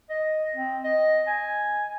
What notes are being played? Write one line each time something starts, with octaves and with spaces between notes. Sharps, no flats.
D#5
C4
D#5
G#5